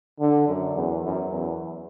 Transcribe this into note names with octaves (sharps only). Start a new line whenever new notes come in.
D3
F#2
E2
F#2
E2